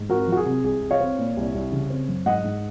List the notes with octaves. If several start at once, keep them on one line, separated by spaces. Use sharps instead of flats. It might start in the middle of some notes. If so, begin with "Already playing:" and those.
Already playing: G#2
C4 F#4 A#4
F#3 F#4
G#4
C3
C2 G#4
C2
C#5 F5
C4
A#2
C2
C2
C#3
C4
F#2
G#2 D#5 F#5
G#2